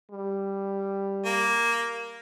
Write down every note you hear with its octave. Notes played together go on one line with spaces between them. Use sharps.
G3
A#3